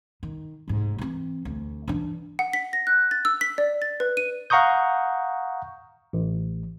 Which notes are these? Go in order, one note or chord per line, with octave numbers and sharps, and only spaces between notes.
D#3
F1 G#2
E3 C4
D2
E3 D4
F#5
B6
A#6
F#6
A6
E6
B6
D5
A6
B4
D#7
F5 F#5 A#5 C#6 D#6 G6
A1